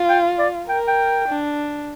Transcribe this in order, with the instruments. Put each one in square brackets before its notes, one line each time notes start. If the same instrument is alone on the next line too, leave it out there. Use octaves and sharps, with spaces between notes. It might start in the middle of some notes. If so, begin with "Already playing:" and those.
Already playing: [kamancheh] F4
[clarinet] G5
D5
[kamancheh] A#4 [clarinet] G5
[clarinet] G5
[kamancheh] D4